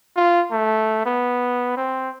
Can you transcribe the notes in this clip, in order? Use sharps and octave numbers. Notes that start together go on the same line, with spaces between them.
F4
A3
B3
C4